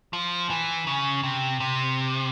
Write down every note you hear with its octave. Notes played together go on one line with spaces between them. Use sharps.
F3
E3
C#3
C3
C3